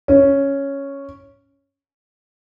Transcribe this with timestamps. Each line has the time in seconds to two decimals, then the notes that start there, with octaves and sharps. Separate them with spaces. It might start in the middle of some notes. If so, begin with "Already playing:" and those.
0.08 C#4